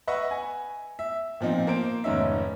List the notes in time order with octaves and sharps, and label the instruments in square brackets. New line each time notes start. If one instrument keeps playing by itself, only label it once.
[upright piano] B4 D#5 E5 F#5 C#6
G#5
E5
A#2 F3 C4 D#4
A#3 C5 D7
F1 G#2 D#3 C#4 D#4 E5